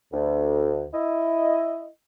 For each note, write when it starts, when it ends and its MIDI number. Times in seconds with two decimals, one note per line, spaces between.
0.13 0.84 38
0.93 1.88 64
0.93 1.88 75